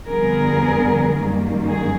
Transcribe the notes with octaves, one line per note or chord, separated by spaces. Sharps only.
F2 D3 G3 B3 G#4 A#4
F#2 D#3 G3 A#3
G#4